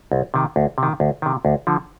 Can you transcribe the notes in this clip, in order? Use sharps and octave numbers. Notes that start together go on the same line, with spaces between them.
C2
C3 D#3
D2
C3
D#3
D2
C3 D#3
D2
D3 F3